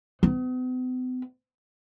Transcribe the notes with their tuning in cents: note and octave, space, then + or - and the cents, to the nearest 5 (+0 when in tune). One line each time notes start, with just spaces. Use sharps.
B3 +45